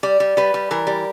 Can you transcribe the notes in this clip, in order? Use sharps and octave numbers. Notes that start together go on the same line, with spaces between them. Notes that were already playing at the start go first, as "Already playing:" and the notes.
G3 D5
G3
G3 B4
G3
E3 A#4
G3